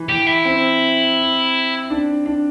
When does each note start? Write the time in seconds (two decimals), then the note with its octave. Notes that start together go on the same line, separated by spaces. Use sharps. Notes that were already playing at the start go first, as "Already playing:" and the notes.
Already playing: E3
0.09 G4
0.27 E4
0.45 C4
1.90 D4
2.26 D4